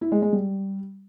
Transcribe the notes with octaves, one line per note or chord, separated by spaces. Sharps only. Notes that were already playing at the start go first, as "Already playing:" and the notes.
E4
G#3
G#3
G3